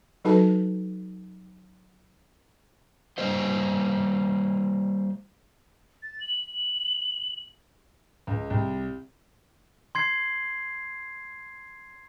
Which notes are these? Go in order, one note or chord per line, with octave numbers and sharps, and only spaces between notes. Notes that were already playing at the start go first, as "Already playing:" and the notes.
F#3 D#4 F#4 A4 B4 A5
G3 A#3 C5 D#5
A6
F#7
C#2
C2
C6 G#6 C7